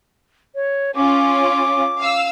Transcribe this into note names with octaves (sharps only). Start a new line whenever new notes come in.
C#5
C#4 F4 D6
F5 E6